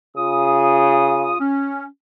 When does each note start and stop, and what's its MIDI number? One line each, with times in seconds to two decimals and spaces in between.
0.17 1.34 49
0.17 1.38 65
0.17 1.38 87
1.41 1.86 61